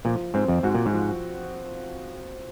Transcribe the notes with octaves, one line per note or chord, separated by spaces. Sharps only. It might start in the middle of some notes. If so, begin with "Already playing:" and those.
A#2 F3
G#2 C4
F2
G#2 F#4
A#2
G#2
F3